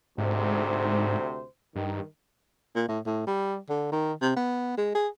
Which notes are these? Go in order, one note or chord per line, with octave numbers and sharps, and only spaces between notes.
D2 G#2 C3 C5
G2 D#3
A#2
A2
A2
G3
D3
D#3
C3
B3
G#3
G#4